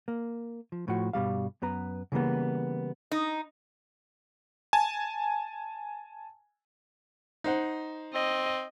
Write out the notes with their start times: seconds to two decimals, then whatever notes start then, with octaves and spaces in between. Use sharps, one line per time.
0.08 A#3
0.72 F3
0.88 A2 F3 F#4
1.13 G2 B2 G3 F5
1.62 F#2 B3 B4 A#5
2.12 C#3 E3 G3 A#3 B3
3.11 D#4
4.73 G#5 A5
7.44 D#4 C5 F#5
8.14 C4 D#5